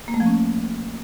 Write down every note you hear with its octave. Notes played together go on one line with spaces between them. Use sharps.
A#3
A3
F3
C#4